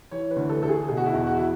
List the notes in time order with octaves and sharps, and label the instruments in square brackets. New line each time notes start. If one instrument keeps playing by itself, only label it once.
[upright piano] E3 C#5
B4
D2
A4
D2 A4
G#4
B2 G#4
F#4
E4
E2 F#4
F#4
E4